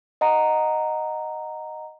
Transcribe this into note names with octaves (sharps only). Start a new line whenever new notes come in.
D#5 F#5 A#5